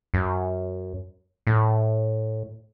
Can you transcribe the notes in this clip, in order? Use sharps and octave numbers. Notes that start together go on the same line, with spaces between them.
F#2
A2